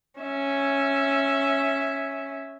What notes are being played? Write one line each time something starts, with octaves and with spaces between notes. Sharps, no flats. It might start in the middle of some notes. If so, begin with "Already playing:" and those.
C#4 E5